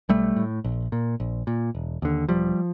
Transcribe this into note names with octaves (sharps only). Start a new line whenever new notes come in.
B1 G3 A3
A2
A#1
A#2
A#1
A#2
E1
D#2 D3
E1 F3 G3